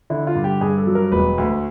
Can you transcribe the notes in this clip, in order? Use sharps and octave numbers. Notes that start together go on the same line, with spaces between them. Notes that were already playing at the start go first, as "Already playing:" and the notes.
D3 E4
F4
G2
G4
G2 G#4
A4
F#3
A#4
E1 B4
D2